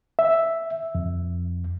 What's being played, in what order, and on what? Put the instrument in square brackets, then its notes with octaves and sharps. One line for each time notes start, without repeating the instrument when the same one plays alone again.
[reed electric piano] E5
F2